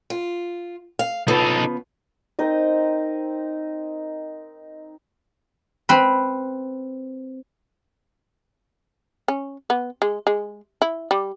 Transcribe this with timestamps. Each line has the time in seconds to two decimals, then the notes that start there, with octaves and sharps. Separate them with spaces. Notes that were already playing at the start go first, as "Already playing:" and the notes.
0.10 F4
0.99 F5
1.28 C#3 F3 B3 D#4 A4
2.39 C4 D#4 A#4 D#5
5.89 C4 B4
9.28 C#4
9.70 B3
10.02 G#3
10.27 G#3
10.82 E4
11.11 G3